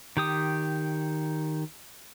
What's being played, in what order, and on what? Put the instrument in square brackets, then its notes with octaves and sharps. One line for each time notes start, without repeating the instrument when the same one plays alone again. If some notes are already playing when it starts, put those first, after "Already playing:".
[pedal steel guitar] D#3 G4 D#6